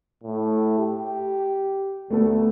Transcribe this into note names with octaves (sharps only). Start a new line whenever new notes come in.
A2
G4
D2 A3 B3 A4